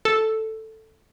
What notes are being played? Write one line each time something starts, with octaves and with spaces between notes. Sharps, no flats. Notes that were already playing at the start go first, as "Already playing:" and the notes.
A4